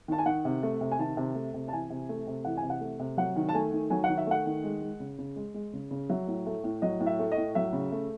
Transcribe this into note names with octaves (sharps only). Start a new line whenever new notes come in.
D#3 A5
G#5
D#3 F#5
C3
A3
C3
G#5
D#3 A5
C3
A3
C3
A5
E3 G#5
C3
A3
C3
E3 F#5
G#5
C3
F#5
A3
C3
F#3 F#5
D#3
A5
A3 G#5
D#3
F#3 G#5
D#3 F#5
E5
A3 F#5
D#3
G#3
G#3
C#3
C#3
G#3
G#3
C#3
C#3
F#3 E5
A2
A3
A2
F#3 D#5
A2
E5
A3
D#5
A2
F#3 E5
C#3
A3